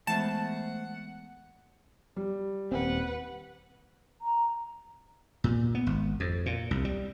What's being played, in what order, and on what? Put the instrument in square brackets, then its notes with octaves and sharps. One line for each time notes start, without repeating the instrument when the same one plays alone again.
[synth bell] E3 G#3 B3 [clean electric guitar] A3 C5 E5 [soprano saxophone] F#5 [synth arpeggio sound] A5
[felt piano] G3
[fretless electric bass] D#1 C4 [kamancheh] B4 F#5
[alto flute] A#5
[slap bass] A#2
B3
G#1
F2
A#2
C2
G3